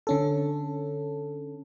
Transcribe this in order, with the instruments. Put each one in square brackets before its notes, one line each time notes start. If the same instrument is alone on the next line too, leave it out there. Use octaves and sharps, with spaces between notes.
[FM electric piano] D3 C#4 A4